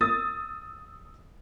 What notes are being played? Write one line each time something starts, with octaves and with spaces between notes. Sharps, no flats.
D#6 E6 A6